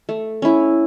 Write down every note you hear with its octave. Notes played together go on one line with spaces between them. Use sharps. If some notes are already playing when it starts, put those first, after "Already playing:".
A3
C#4 E4